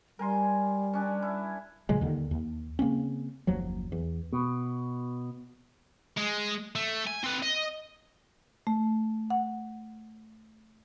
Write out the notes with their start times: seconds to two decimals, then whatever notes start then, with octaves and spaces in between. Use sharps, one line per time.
0.19 G3 A#4 G#5 C6
0.93 C#4 D4
1.22 E4
1.89 A#2 C#3 F#3 G#3
2.01 D#2 D3 D#3
2.31 D#2
2.79 C#3 A#3 C4 C#4
3.47 F#1 D#2 F3 F#3
3.92 E2
4.33 B2
6.17 G#3
6.76 A3
7.07 G#5
7.24 C4 B4
7.43 D#5
8.67 A3
9.30 F#5